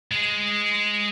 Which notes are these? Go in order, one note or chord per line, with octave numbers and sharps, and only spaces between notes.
G#3 G#4